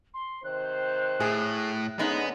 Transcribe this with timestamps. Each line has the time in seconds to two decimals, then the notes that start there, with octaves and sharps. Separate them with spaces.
0.14 C6
0.44 C3 D#3 C5 F#6
1.20 A2 G#4
1.99 D3 G#3 B3 C#4 D#4